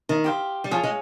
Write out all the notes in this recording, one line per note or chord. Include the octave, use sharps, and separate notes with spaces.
D#3
G4 C5 F5
G3
F3 G#4 C#5 F5
G#3